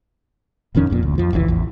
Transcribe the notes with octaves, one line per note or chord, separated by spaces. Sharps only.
D#1 F2 D#3 C#4
F1 F2 A#2
D2
F2 F3
F1 C2 B2 E3
A1 E2